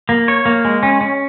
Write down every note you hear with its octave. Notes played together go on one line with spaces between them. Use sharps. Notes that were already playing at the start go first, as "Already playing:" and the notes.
A#3
C#5
A#3
G#3
C#4
C#4